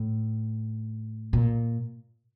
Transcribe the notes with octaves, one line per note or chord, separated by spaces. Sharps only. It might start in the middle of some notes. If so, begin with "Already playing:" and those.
Already playing: A2
A#2